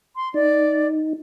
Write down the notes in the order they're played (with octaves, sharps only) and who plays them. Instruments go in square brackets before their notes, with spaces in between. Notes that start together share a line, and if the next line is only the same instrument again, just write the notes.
[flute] C6
[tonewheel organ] D#4 [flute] D5